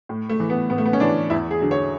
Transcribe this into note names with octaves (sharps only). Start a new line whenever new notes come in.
A2
A3
E3
B3
A2 B3
A3
B3
C#4
E3 D4
E2 E4
G#4
D3 F#3
C#5